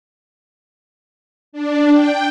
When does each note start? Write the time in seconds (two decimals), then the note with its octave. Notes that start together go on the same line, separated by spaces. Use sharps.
1.53 D4
1.92 G5